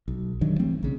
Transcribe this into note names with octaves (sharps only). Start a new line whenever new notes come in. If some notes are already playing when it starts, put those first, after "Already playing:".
B1
G2 D3 D#3 F#3
E3 A3 C4
B1 C#3